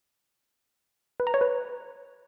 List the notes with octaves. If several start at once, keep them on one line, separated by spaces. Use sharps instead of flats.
B4
A#5
C#5
B4